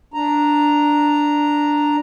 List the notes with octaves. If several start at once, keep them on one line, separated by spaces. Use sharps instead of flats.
D4 A#5